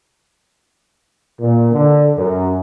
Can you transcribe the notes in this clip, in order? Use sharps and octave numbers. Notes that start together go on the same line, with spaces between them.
A#2
D3
F#2